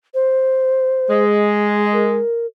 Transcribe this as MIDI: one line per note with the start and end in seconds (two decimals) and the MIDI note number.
0.14 1.23 72
1.10 2.19 56
1.93 2.46 70